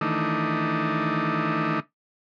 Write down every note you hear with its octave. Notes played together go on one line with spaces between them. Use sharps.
D#3 E3 A3 D4 D#4